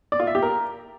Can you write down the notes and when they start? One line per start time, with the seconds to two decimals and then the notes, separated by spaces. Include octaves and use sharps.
0.12 D5
0.20 F4
0.27 E5
0.35 G4
0.42 A#4